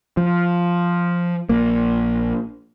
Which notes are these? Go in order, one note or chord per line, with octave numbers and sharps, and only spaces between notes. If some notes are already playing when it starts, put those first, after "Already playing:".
F3
A#1 A#3